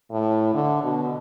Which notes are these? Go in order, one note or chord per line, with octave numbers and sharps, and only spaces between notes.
A2
D3
B2